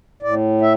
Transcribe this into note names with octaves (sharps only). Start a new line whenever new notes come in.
A2 D5
E5